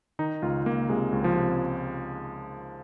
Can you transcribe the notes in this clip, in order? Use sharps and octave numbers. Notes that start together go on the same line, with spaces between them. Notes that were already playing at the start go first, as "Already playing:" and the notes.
D#3 D#4
C#2 F4
C#2 A#3
C3 G#3
C#2
F3
C3